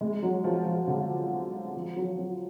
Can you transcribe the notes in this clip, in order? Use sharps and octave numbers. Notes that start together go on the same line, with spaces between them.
G#3
F#3
F3
F3
D3
F3
F#3
F#3